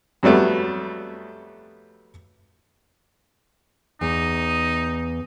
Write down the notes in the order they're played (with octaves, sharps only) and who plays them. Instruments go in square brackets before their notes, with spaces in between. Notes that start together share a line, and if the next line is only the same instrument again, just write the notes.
[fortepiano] F2 F#3 G3 A3 B3
[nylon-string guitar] E2 [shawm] D#4